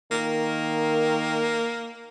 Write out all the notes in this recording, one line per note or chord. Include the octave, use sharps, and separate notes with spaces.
D#3 A#3